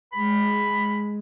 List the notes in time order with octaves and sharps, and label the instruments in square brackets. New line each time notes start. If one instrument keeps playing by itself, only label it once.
[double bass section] G#3 [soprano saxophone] B5